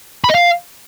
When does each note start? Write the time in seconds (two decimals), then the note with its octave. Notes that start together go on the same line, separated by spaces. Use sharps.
0.24 B5
0.30 D#5
0.35 F5